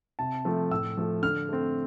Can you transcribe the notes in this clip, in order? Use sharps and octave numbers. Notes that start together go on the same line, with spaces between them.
C3 A5
F3 A3 C4
A2 E6
F3 A3
D3 F6
A3 C4